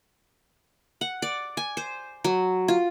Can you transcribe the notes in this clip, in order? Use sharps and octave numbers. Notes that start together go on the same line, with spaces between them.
F#5
D5
G#5
C5
F#3
F4